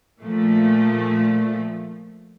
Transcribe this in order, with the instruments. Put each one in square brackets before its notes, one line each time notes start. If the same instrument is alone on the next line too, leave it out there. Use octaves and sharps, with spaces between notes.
[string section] A#2 F3 A3